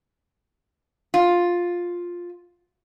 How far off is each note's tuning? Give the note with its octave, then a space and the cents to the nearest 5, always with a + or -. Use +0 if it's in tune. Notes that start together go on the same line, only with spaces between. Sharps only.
F4 +5